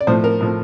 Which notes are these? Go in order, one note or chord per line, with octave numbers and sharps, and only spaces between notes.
D5
A2 F3 C5
A#4
A2 F3